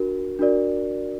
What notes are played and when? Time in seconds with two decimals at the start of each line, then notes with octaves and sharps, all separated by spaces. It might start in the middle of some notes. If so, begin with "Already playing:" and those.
Already playing: D4 F#4 A#4
0.39 D4 F#4 A#4 D5